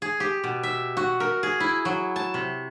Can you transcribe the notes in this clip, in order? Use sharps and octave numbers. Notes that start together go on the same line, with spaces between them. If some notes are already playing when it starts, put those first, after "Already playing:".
G#4
G4
B2
E5
F#4
A#4
G#4
E4
F#3
A5
C3